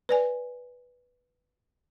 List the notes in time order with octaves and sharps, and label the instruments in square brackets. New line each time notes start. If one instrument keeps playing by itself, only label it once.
[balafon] B4 D5 G#5